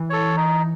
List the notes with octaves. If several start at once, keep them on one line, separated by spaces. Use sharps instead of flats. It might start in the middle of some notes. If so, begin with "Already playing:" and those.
Already playing: E3
A4 C#5
D#4